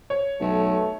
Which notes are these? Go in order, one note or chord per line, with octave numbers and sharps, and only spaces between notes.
C#5
B1 A3